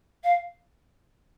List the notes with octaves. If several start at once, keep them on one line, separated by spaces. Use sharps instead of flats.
F5